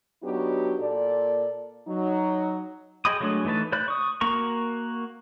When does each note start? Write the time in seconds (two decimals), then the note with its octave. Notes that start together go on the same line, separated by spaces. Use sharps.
0.23 F#3 B3 D4 D#4 F#4 G4
0.79 A#2 A4 D5
1.88 F#3 D#4
3.05 G#4 D#5 G5 B5 D#6
3.21 F#3 G#3 A3 D4
3.45 E3 A3 D#4 B4 A5
3.72 C5 D5 B5 F#6
3.88 C#6 D#6
4.21 A#3 F#4 A#4 A#5 C#6